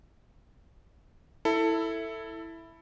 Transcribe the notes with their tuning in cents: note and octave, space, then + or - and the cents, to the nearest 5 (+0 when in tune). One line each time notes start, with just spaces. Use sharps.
E4 +0 A4 +15